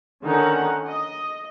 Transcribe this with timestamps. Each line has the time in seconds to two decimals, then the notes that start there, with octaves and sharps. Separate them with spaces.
0.24 D3 D#3 C#4 D#4 F#5 A#5
0.86 D#5